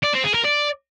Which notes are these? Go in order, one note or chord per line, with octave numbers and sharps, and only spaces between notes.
D5
C4
G#4
A#4
D5